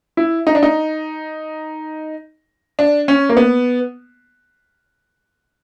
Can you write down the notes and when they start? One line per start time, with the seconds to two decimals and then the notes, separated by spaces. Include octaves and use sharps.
0.17 E4
0.47 D#4
0.55 D4
0.63 D#4
2.79 D4
3.08 C#4
3.29 A#3
3.37 B3